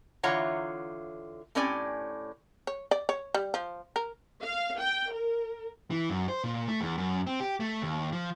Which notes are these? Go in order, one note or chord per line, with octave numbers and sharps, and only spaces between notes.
D3 E3 F4 C#5 F#5 A#5
A2 C4 C#4 G4 D5 G#5
C#5
D5
C#5
G3
F3
A#4
F5
G5
A#4
E3
F#2
C5
A#2
A3
E2
F#2
C4
G4
A3
D#2
F3